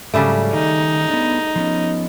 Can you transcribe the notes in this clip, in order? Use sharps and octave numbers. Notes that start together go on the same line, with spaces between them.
G#2 C#3 F#3 G3 A3
D#3 D#4
B3 D4
F3 B3 C#4